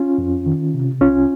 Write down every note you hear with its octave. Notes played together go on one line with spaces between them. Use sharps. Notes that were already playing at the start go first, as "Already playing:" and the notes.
Already playing: C#4 F4
F2
D#3
C3
C2 C#4 F4